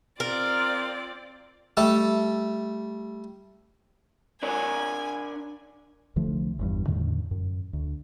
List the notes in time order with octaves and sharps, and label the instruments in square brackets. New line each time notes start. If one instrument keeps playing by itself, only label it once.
[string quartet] C4 F4 D5 [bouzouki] A#4
[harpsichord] G3 A3 A4
[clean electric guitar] D4 A#4 C#5 [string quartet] G#5
[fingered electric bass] C2 D3 F3 A3
G1 E2 G2
E2 A2 D3 D#3
F#2
D2